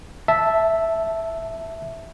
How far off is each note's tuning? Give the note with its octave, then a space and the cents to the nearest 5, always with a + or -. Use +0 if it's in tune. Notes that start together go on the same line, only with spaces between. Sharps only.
E5 +0 A5 +0